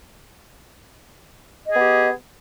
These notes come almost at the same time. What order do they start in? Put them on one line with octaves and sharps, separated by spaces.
D#5 G#4 B3 G4